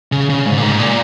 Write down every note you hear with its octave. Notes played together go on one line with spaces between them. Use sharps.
C#3
C#3
G#2
A#2
G#2
A#2